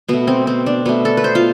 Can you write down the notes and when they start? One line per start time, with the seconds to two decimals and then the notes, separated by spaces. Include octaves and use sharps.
0.08 B2 A3 B3
0.27 C4
0.47 C4
0.66 D4
0.85 B2 A3 B3
1.05 A4
1.17 B4
1.24 C5
1.35 F4